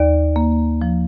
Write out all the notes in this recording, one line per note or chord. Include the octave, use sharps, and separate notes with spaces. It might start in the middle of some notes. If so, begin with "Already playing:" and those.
Already playing: D#2 D5
A#3
F3